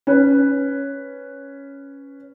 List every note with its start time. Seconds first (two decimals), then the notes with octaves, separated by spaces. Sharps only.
0.07 C#4 B4